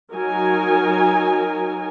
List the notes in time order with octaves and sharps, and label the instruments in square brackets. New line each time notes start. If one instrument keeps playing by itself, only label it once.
[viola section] F#3 D#4 A#4 G#5